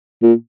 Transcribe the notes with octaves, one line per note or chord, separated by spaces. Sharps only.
A#2